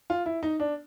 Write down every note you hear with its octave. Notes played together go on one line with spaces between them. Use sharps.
F4
E4
D#4
D4